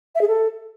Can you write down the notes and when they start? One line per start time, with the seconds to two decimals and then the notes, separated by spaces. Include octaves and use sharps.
0.15 E5
0.21 G#4
0.28 A4